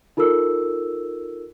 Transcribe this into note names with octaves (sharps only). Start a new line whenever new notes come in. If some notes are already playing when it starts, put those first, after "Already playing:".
D#4 F4 A4 A#4 E6